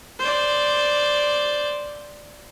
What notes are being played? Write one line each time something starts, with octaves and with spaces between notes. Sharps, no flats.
C5 D5